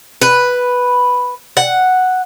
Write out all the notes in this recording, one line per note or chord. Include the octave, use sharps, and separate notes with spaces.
B4
F#5